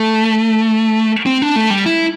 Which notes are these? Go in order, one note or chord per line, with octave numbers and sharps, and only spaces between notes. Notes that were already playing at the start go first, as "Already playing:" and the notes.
Already playing: A3
C4
D4
A3
G3
E4